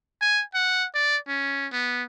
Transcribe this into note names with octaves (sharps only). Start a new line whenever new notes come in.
G#5
F#5
D5
C#4
B3